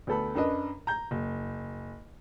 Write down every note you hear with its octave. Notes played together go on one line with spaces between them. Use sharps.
D2 B3 A4 B5
F#2 D4 B4 D#5
A#5 G6
F#1